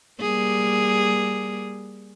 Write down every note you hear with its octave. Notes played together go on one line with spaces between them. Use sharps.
G3 A#3 G#4